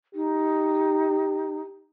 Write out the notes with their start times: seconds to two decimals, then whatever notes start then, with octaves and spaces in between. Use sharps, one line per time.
0.15 D#4 G4